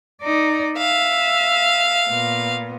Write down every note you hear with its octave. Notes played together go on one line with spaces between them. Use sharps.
D#4 D5
E5 F5
A#2 B3